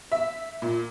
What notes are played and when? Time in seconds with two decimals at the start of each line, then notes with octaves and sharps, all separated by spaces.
0.12 E5
0.62 A#2